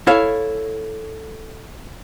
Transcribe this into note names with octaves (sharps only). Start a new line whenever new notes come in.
E4 A4 C#5 F5